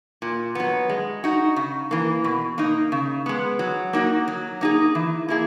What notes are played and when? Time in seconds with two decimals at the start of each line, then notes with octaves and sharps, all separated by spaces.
0.22 A#2
0.55 F#3 B3
0.89 G#3
1.24 D#4 F#4
1.56 C#3
1.91 E3 A#3
2.24 B2
2.58 A#3 D#4
2.92 C#3
3.26 G#3 B3
3.59 F#3
3.93 A#3 D#4 F#4
4.28 F#3
4.61 A#3 D#4 G#4
4.95 E3
5.28 A#3 E4 G#4